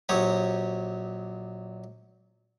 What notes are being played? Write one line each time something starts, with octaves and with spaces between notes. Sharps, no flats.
A#1 F#3 G4 C#5 D#6